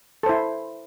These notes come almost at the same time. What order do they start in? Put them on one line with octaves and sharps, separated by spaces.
A4 C5 E4